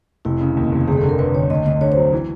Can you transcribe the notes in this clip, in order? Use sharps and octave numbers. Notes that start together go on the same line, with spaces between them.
F1 E4
C#3
D#2
F1
G1 G#4
A4
D3
A#4
D3 B4
G1 C#5
D2 D#5
D2 D#5
D3 C#5
C5
F#3
E3